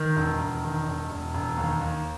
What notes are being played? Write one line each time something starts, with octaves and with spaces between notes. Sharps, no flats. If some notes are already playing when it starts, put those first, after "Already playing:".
Already playing: D#3 A#4
E1
E1
D#3
E1
E1
E1
D#2
D#2